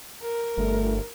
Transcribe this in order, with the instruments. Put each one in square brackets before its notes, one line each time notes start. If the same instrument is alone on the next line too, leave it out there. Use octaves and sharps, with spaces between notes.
[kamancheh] A#4
[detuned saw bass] G1 [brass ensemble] A3